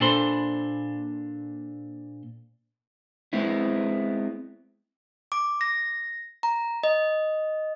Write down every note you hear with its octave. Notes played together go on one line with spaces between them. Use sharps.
A#2 D4 A4 C5 B5 C6
G#3 B3 C4 E4
D6
A#6
A#5
D#5